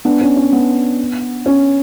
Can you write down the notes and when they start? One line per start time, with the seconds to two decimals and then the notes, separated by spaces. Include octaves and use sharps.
0.05 B3 D4
0.21 C#4
0.37 C#4
0.53 B3
1.46 C#4